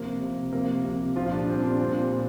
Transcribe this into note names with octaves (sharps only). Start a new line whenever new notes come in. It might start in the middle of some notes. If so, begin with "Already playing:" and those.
Already playing: C3 F3 A#3 A#4
C3 F3
C3 F3 A#3 A#4
C3 F3
A#2 F3 G3 F4
F4
D4
A#2 G3 C4
D4
A#2 G3 C4
A#2